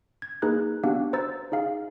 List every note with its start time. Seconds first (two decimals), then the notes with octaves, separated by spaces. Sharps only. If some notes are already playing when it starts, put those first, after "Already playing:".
0.22 G#6
0.42 A#3 D#4 G#4 B4 F#6
0.83 B3 D4 F#4 G4 F5 F#6
1.13 C5 A#5 E6 A6
1.52 D#4 G#4 F5 C7